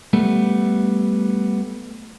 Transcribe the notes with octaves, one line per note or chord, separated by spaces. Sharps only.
G3 A3 B3